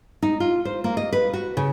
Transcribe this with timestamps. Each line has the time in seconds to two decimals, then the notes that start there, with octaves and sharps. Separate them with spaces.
0.22 D#4
0.40 F4
0.65 C5
0.84 A#3
0.97 D#5
1.12 B4
1.33 F#4
1.57 C#3